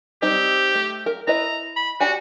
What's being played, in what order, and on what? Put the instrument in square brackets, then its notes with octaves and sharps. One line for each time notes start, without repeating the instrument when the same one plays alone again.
[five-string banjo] G3 C4 D#4 [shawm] G4
[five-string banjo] A3
A#4
[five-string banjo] E4 B4 D#5 [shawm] A#5
[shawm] B5
[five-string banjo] D4 G4 G#5 [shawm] F#4